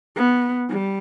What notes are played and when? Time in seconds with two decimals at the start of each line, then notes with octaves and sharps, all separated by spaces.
0.16 B3
0.70 G3